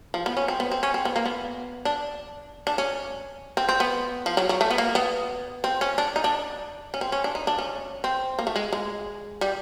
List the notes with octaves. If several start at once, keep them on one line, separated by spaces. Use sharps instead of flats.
F3
B3
C#4
C4
B3
C4
C#4
C4
B3
A#3
B3
D4
D4
C#4
C4
C4
B3
F3
F#3
F#3
A3
B3
A#3
B3
C4
C#4
D4
D#4
D4
C#4
C4
C#4
D4
D#4
D4
C#4
C4
A#3
A3
G#3
G#3
G3